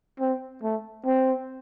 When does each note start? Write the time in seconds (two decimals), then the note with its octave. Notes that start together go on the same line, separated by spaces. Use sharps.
0.20 C4
0.63 A3
1.06 C4